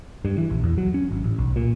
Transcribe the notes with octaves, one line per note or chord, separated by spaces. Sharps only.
G2
E3
A#1
E2
F#3
C#4
G#1
A1
B1
A#2